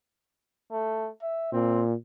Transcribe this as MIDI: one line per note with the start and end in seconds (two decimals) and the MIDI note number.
0.71 1.09 57
1.22 1.51 76
1.52 1.94 46
1.52 1.83 60